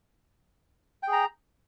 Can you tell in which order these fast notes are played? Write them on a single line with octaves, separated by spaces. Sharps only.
G5 G#4 A#5